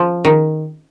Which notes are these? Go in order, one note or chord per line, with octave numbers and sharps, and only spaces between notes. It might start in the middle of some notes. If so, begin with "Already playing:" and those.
Already playing: F3
D#3